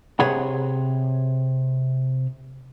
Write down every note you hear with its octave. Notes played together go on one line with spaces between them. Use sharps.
C3 G#4 C#5 F#5 B5